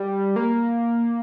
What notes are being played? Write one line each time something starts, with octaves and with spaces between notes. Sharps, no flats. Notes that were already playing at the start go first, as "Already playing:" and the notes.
Already playing: G3
A#3